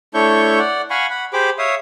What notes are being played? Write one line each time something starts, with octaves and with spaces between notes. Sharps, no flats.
A3 D4 E4 C#5 C#6 G6
D5 F#5
F5 F#5 G#5 B5 C#6
F#5 B5
G4 G#4 C5 B5 D6
C#5 E5 F5 D#6